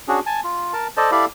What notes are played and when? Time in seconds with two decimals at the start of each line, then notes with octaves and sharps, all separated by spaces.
0.08 C#4 D4 F#4 G#4
0.26 G#5 A5
0.44 F4
0.73 A#4 A5
0.97 A4 C5 D5 D#5 A5
1.12 E4 G4 A4 D5 F5 B5